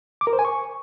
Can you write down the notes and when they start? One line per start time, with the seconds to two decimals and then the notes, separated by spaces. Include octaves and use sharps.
0.21 D6
0.27 A#4
0.33 C5
0.39 G#5
0.45 C#6